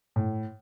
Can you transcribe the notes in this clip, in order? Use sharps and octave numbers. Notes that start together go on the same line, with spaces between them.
A2